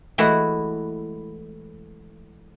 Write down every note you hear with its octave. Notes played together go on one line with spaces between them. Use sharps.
E3 G#3 A3 E4 F#4